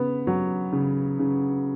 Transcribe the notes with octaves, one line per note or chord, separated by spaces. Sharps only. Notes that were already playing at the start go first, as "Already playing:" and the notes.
Already playing: C#3 B3
F#3
C#3
C#3